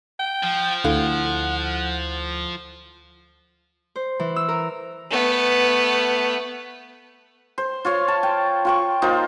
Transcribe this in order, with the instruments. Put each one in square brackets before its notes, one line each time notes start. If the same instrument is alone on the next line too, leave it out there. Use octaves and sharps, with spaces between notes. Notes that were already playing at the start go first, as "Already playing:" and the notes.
[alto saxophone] G5
[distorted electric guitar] F3
[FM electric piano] D2 [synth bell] E4 A4 F5 [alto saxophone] F#5
[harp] C5
E3
E6
A#4
[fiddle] A3 B3
[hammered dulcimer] C5
F4 C#5 F5
A5
G5
F4 G5 C#6
A#3 D#4 F4 C5